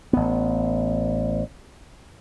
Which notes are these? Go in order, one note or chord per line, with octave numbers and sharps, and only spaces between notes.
A1 B3